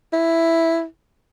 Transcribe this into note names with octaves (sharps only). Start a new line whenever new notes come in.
E4